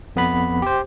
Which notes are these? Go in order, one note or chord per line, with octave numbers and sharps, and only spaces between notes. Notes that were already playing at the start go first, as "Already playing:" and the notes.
F2 B3 B4 B5
G4 C5